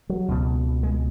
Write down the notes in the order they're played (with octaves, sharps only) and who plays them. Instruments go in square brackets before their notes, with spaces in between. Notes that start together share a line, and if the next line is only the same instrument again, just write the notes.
[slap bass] F#3
C#2 B2
G#3